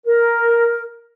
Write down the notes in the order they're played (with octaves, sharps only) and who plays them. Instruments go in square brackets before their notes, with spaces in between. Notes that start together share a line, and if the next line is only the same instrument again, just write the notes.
[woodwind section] A#4